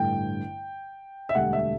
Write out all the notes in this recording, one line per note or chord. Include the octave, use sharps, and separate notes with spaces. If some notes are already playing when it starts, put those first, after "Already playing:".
Already playing: A1 G2 D3 G5
E5
E1 D2 D3 G3 D4 F#5
E5